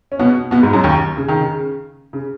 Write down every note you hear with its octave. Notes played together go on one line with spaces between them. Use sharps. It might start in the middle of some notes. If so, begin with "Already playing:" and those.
C#4
B2 B3
B2 B3
G#2 G#3
F#2 F#3
D#2 D#3
C#3
D#3
C#3
C#3